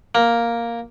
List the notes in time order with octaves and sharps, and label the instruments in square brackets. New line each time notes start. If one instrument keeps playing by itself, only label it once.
[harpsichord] A#3